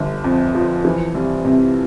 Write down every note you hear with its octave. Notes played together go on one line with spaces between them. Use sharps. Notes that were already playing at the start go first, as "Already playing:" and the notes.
Already playing: G1 D3
F2
F3
E3
C2
C3